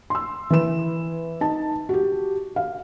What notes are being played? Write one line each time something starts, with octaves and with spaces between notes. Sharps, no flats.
C6 E6
E3 B4 E7
D#4 A5
F#4 G4
F5